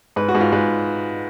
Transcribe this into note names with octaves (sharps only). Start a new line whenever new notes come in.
G#2 B4
F#4
G#2
F4
G#2 B4